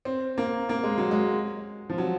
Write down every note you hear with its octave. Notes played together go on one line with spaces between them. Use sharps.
C4
A#3
A#3
G#3
F#3
G#3
F3
F#3